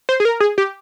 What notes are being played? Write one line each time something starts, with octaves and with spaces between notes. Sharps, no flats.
C5
G#4
A#4
G#4
G4